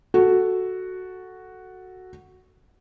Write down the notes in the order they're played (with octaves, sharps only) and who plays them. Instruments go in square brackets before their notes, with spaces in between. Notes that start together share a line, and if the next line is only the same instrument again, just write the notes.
[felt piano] F#4 A4